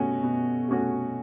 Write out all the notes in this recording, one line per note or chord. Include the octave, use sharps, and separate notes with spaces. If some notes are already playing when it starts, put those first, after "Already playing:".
Already playing: B2 A3 C#4 F#4
B2
A3 C#4 F#4